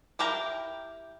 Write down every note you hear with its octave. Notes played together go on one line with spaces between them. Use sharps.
E4 G4 A#4 G5 A#5